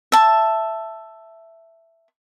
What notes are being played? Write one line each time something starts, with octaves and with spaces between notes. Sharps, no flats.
E5 A5